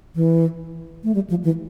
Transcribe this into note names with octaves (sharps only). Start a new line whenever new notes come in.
E3
A3
G3
F3
E3